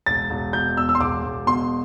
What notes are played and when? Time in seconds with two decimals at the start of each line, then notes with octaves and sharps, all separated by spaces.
0.06 E1 A6
0.30 E1
0.53 B2 G6
0.77 E2 E6
0.89 E6
0.95 C6
1.00 E1 D6
1.23 E1
1.47 B2 C6